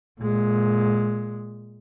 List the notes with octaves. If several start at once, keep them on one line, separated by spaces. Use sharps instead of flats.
A#2 G#3